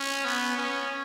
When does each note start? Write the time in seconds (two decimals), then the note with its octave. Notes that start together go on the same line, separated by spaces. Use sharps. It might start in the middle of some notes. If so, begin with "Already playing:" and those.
Already playing: C#4
0.25 B3
0.57 C#4